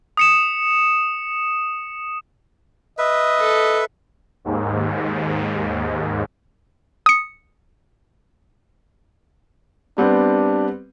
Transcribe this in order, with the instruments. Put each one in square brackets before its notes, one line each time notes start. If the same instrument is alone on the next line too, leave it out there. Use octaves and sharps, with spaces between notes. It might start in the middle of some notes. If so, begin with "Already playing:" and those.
[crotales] D#6 C#7 E7
[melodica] B4 E5 [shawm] D#5
[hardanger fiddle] A4
[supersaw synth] D#2 G#2
[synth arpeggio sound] D#6 C#7
[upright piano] G3 B3 C4 [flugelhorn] D4